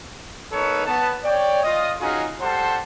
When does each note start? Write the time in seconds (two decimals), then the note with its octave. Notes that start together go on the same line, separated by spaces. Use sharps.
0.52 A#3 D#4 A4 B4 C#5
0.86 B3 A5
1.24 C#5 D5 G5
1.63 F4 D#5 D#6
2.01 C#4 D#4 F4 F#4 G#4
2.41 G3 A4 C5 F#5 A5 C6